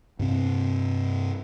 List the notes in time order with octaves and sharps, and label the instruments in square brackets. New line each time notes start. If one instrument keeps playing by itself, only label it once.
[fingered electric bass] G2 C3 C4